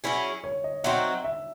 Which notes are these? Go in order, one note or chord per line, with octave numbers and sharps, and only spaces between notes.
F#3 C#4 E4 G#4
C#5
D#5
F#3 C4 D#4 F#4 E5
E5